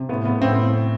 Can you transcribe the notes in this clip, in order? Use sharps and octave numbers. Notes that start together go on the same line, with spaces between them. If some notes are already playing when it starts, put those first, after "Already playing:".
Already playing: C3
A2 B3
A2 B3
A2 C4